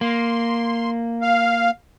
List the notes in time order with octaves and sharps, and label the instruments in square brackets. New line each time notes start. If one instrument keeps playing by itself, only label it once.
[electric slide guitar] A#3 [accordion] C6
[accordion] F5